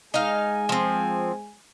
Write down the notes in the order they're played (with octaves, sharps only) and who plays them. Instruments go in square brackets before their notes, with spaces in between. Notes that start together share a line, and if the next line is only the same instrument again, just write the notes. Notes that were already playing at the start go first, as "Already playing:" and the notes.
[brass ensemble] G#3 G#5 [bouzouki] D#4 F5
[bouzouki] F3 C4